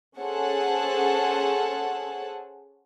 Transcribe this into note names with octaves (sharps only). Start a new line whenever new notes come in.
C#4 G#4 A4 C5 F#5 A5